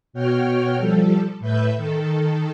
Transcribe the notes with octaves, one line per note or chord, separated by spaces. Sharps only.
B2 F#4 C#5 G5 F6
F3 G3 A4
A2 B4 E5 G6
D#3 A4